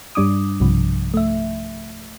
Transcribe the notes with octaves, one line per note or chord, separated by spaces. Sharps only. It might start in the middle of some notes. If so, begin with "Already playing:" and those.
G2 G3 D4 D6 D#6
B1 G2 C3 F3
A3 E5